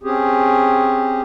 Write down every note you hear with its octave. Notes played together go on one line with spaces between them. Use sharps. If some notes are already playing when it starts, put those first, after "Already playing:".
C4 C#4 G4 G#4